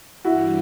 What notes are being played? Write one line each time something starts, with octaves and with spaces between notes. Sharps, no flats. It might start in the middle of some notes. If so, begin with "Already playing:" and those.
G2 E3 G3 E4 F#4